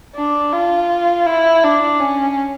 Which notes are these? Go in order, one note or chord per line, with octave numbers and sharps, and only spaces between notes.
D4
F4
E4
D4
C#4